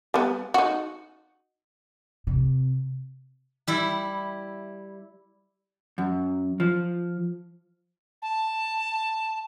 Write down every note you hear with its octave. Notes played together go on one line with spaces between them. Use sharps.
G3 B3
D#4 F#4
C3
G3 E4
F#2
F3
A5